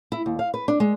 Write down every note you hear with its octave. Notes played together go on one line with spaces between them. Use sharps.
E4
D#2
F5
B4
D4
G#3